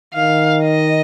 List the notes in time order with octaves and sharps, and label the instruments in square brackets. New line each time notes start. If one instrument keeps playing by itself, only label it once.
[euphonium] D#3 [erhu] F5
[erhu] D#5